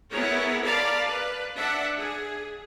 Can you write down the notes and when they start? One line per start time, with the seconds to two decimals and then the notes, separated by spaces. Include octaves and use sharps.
0.11 B3 E4 G#4 A#4 C#5
0.63 A#4 D5 F5 A5 B5
1.02 B4
1.56 D4 E5 F#5
1.99 G#4